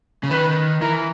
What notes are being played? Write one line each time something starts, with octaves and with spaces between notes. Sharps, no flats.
C#3
D#3 B4
E3 A#4